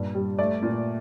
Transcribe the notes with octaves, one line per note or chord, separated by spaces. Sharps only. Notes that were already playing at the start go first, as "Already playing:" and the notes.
Already playing: G2 A#2
G3
A3 D5
A#2